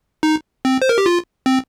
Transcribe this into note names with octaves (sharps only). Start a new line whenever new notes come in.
D#4
C4
C5
A#4
G4
F4
C4